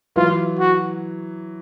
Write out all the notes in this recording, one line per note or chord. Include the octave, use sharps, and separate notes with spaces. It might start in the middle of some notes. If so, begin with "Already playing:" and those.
E3 F#3 F4
F#4